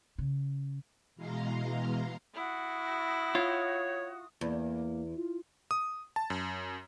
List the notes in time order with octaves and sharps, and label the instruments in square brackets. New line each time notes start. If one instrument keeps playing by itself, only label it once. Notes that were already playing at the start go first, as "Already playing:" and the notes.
[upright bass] C#3
[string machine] B2 E3 G#3 F5 A#5 C6
[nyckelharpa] E4 [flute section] F#4 D#6
[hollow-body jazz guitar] F4 [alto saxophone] C#5
[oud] E2 [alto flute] A#3
[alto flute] F4
[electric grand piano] D#6
A5
F#2